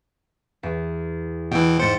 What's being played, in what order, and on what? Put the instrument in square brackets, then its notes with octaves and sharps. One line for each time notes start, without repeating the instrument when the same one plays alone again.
[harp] E2
[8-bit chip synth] B2 E3 [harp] G5 E6
[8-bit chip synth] G#2 C5 [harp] A6 C#7